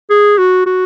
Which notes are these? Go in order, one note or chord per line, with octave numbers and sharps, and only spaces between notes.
G#4
F#4
F#4